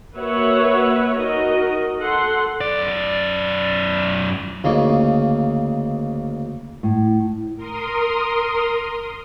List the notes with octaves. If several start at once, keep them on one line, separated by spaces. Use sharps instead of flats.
A#3 F#4 B4 C#5 E5 F#5
D#4 F#4 A#4 D#5
A4 F#5 C6
F#2 D5
D2 C#3 A#3 D#4 C#6
A2
A#4 C6 D#6